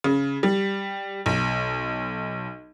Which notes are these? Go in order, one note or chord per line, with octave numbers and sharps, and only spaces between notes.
C#3
G3
B1